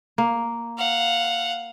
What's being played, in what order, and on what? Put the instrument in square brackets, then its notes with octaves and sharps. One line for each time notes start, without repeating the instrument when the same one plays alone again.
[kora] A#3
[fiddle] F5 F#5